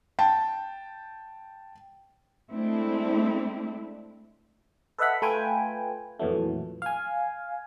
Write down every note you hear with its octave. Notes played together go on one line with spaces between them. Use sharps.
G5 A5
G#3 A3 C4 D4 E4
A4 B4 D#5 E5 F#5 B5
A3 F4 B4 G5 G#5
F2 A#2 E3 F#3 A3
F5 G#5